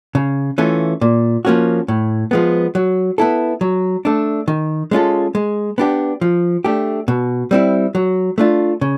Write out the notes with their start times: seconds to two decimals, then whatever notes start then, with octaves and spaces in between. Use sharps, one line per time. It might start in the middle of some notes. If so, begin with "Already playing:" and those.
0.15 C#3
0.58 E3 A3 C#4 F4
1.01 A#2
1.45 F3 A#3 C#4 F#4
1.88 A2
2.31 F3 G#3 B3
2.75 F#3
3.18 B3 E4 A4
3.61 F#3
4.05 A3 D4
4.48 D#3
4.91 G#3 C#4 F4 A4
5.35 G#3
5.78 B3 D4 G4
6.21 F3
6.65 A3 D4 G4
7.08 B2
7.51 G3 C4 E4
7.95 F#3
8.38 A3 D4 F4
8.81 C#3